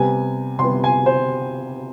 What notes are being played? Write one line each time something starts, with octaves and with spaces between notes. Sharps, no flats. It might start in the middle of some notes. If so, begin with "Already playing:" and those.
Already playing: C3 G3 B3 G#5
C3 G3 B3 C6
G#5
C5